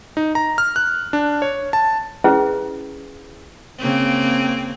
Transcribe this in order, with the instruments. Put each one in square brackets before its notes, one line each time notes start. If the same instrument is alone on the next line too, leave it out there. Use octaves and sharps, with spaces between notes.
[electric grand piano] D#4
A#5
F6
F#6
D4
C#5
A5
[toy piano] C#4 E4 G#4 B4
[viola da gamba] C#3 A#3 C4